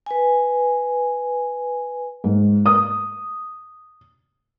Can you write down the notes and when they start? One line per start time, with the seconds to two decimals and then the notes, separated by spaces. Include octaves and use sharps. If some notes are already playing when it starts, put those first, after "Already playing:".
0.06 B4 G#5
2.24 G#2
2.66 D#6